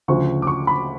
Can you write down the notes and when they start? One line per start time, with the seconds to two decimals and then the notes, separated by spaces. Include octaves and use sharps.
0.08 D2 C#3 F3 C#6
0.42 D6
0.47 C#6
0.67 B5